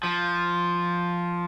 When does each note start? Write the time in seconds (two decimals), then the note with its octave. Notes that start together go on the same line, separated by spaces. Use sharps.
0.03 F3